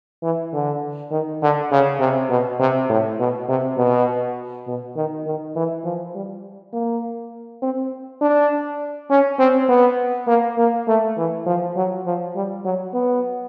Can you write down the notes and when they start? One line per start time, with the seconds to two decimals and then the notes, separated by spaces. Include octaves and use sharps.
0.23 E3
0.53 D3
1.11 D#3
1.42 D3
1.71 C#3
2.00 C3
2.30 B2
2.60 C3
2.89 A2
3.19 B2
3.49 C3
3.78 B2
4.67 B2
4.96 D#3
5.26 D#3
5.56 E3
5.85 F3
6.15 G3
6.73 A#3
7.62 C4
8.21 D4
9.10 C#4
9.39 C4
9.69 B3
10.27 A#3
10.58 A#3
10.88 A3
11.17 E3
11.46 F3
11.76 F#3
12.06 F3
12.35 G3
12.65 F#3
12.94 B3